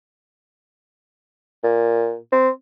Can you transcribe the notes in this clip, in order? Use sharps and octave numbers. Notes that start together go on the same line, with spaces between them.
A#2
C4